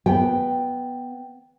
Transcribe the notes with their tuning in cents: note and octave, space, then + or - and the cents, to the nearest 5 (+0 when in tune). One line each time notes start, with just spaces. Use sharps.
B3 -5 G5 +0